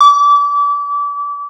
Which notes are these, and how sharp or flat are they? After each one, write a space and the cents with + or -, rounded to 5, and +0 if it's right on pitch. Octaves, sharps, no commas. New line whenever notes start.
D6 -30